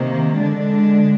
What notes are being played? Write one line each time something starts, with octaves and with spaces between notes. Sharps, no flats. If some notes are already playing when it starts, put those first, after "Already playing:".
Already playing: C3 D#3 A#3
D3 G#3 D4